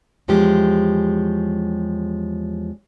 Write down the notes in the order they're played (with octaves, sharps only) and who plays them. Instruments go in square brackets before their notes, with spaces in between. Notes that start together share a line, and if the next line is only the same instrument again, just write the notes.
[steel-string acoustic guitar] E2 F3 G#3 C#4 G4